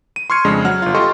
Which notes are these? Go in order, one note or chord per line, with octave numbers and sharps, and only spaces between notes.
D#7
C6 C#6 F6 G#6 C#7
F2 C#3 G#3 D4
F#3 F#5 F6
G1 F4
F4 G4 A4 D#5 C6 C#6